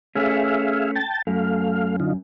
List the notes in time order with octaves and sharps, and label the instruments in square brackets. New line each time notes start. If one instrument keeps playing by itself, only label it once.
[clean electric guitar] A3 C#4 [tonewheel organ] G#4 E5 F5
[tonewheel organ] G5 A5 A6
[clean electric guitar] F#2 [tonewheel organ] A3 F5
[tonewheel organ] D3 D#4 F4